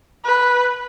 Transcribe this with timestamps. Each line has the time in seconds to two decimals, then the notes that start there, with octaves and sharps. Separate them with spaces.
0.25 B4